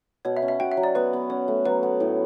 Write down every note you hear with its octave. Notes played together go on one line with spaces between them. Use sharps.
B2 C#5
E5
C#4
E5
F#4 G5
E5
F#3
D5
B3 B4
B3
C#4 C#5
A3
F#3 B4
B3
A2